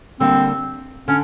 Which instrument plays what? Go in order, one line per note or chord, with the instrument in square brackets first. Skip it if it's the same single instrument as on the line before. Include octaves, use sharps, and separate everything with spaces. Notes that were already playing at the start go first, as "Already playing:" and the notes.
[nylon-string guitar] D3 G3 A#3 [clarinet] C4
[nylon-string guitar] D3 [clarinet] C#4